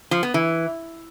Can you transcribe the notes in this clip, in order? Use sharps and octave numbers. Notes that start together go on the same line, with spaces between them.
F3
B3
E3